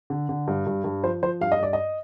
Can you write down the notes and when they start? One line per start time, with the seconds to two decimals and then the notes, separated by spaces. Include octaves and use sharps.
0.10 D3
0.29 D3
0.48 G2
0.66 G2
0.84 G2
1.03 F3 C5
1.23 F3 C5
1.41 G2 F5
1.52 D#5
1.59 G2 D5
1.73 D#5